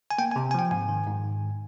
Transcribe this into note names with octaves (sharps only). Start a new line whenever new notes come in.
G#5
A#3 G5
G#5
C3
G#5
F3 G5
G#2 G#5
D#3
G#2